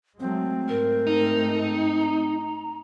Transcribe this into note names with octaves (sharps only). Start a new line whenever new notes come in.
F#3 G#3 A3 C4
G#2 A3 A#4
D#4
A#5